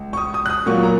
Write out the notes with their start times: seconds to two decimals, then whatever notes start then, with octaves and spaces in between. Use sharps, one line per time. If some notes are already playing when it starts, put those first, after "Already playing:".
Already playing: C#2
0.13 C#6
0.17 D#6
0.34 D#6
0.46 F#6
0.50 D#6
0.66 A#2 F#3 A#3 C#6
0.83 A#5